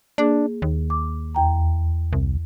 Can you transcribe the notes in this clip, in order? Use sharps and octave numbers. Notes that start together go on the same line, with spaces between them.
A#3 D4 G#4
D#2
D6
E2 G5 A#5
C2